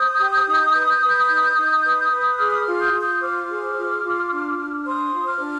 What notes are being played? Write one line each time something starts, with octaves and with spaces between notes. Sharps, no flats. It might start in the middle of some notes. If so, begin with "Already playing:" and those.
Already playing: C5 D#6 G6
G4
D#4
B4
B4
D#4
D#4
B4
B4
G#4 D6 F6
D#6
D6 F6
F4
D#6 G6
F4
D#6 G6
D#6
C5 D6 F6
G#4
F4
F4
D4
D4
C5 C6 D#6
F4
D6 F6
D4